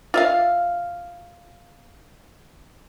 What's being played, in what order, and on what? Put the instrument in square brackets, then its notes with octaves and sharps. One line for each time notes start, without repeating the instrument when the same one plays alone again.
[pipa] F4 E5 F5